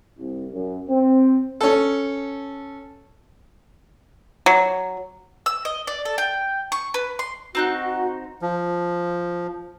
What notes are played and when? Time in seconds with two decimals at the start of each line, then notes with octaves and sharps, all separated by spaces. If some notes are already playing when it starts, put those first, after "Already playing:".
0.18 C2
0.52 F#2
0.89 C4
1.61 C#4 A4
4.46 F#3
5.46 E6
5.65 D#5
5.87 D5
6.05 A4
6.18 G5
6.72 C#6
6.94 B4
7.19 C6
7.55 C4 D#4 F#4 F#6
8.42 F3